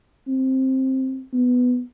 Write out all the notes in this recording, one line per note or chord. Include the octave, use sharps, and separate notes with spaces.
C4
B3